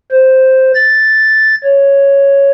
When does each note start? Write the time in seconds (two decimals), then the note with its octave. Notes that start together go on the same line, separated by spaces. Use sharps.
0.12 C5
0.75 A6
1.64 C#5